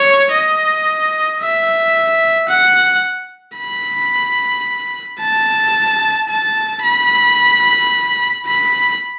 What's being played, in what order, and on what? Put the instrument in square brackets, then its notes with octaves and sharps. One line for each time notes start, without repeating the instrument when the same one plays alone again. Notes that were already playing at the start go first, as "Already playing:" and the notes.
Already playing: [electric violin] C#5
D#5
E5
F#5
B5
A5
A5
B5
B5